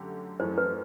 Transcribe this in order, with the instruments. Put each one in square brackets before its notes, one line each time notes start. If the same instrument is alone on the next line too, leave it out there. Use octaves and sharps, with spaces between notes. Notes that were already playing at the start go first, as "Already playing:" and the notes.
Already playing: [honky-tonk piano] F#2 D3 A3 G4
[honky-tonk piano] F#2 E3 A3 [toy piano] C5
[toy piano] B4